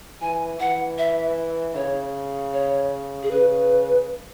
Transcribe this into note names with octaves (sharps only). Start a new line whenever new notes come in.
E3 G#5
E3 F#5
E5
C#3 C#5
C#5
G#4
C#3 B4